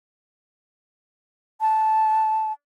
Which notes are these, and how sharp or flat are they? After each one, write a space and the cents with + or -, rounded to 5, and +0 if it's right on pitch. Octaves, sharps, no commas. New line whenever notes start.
A5 -10